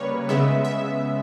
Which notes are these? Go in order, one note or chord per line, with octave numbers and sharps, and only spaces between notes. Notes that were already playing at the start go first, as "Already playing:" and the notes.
Already playing: C#3 G3 A#3 B4 C#5
C#3 G#3 B3 E5
E5